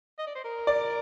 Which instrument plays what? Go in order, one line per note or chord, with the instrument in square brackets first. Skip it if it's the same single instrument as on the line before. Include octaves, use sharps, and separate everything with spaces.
[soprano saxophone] D#5
D5
C5
A#4
[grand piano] D5